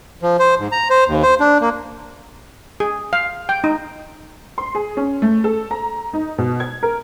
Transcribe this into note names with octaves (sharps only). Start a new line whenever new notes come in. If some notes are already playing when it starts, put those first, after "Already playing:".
F3
C5
G#2
A#5
C5
D#2
C5
D4
A#3
G#4
F5
G5
D#4
C6
G#4
C#4
A3
A4
A#5
D#4
B2
G#6
A#4